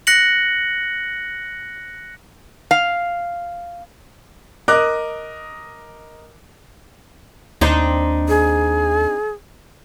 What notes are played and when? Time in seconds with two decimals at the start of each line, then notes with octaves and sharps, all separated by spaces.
0.07 F#6 A#6 C#7 F#7
2.71 F5
4.68 A#4 D#5 D6 D#6 F#6
7.61 D#2 C4 D4 D#4
8.29 G#4